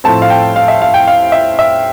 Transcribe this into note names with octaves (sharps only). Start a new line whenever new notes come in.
A2 F3 A3 C4 A5
F5
G5
F5
E5
F5
G5
F5
E5
E5